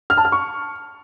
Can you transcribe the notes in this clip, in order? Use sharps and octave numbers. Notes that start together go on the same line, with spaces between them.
F6
A5
F6
C#6